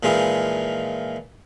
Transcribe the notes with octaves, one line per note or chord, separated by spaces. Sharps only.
A#2 E3 F3 G#3 D#4 E4